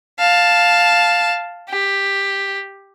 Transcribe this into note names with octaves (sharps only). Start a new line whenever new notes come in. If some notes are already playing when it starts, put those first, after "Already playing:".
F5 A5
G4